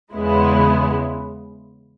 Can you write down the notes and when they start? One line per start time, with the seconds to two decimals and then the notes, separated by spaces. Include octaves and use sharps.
0.13 E2 C#3 G#3 B3 E4